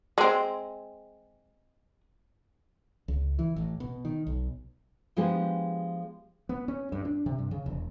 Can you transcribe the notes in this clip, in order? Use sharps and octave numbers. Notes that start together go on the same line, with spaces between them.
G#3 C4
C#2
E3
A1
B2
D#3
B1
F3 G#3 B3 D4 G4 G#4
B3
C#4
G2
D4
C3
G2
C#3
E1